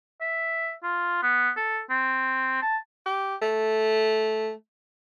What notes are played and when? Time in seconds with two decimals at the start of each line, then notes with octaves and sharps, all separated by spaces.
0.21 E5
0.83 F4
1.23 B3
1.57 A4
1.90 C4
2.62 A5
3.06 G4
3.42 A3